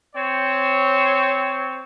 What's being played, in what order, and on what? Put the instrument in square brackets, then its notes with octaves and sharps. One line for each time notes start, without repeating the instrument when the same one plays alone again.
[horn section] C4 C#5